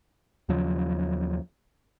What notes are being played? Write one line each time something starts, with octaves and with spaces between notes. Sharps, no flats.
D#2 C#3 F3 F#3